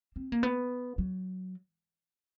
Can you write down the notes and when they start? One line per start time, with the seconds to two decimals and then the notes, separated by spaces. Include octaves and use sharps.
0.16 C4
0.32 A#3
0.43 B3
0.98 F#3